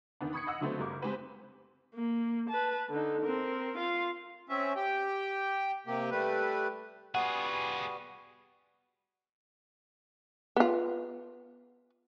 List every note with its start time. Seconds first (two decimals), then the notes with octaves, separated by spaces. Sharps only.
0.21 E2 D#3 B3 D4
0.33 B5 C#6 D#6 G#6 C7 C#7
0.47 D#5 F#5 E6
0.61 D3 F#3 A3 B3 C4
0.78 F#1 G3 A#4 D6
1.02 G#3 C4 G4 B4 C5
1.95 A#3
2.49 B4 A5
2.90 D3 D#4
3.22 C4 A#4
3.77 F4 F5
4.49 C4 C#4 E5
4.76 G4 G5
5.87 C3 A#3 G4
6.11 G3 A3 B4
7.15 G3 B3 F4 F#4 G#4 F#5
10.56 B3 F4